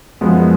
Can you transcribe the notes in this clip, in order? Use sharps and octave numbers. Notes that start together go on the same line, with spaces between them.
F#2 F3 G#3 B3